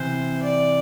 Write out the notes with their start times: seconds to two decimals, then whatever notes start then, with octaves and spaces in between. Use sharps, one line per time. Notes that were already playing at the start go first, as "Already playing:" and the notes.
Already playing: C3 E3 C5
0.43 D5